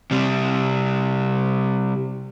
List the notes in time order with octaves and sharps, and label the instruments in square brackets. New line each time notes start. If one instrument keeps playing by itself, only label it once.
[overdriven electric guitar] C3 G3